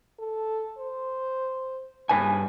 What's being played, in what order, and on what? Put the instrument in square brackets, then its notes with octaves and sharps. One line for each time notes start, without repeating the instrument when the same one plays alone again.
[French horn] A4
C5
[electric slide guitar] G2 B4 G#5 [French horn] C#3